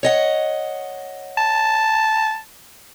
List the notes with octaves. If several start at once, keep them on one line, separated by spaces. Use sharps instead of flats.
C#5 D#5 F#5
A5